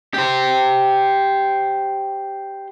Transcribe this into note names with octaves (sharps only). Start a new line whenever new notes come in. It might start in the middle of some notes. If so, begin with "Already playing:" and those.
G4 C5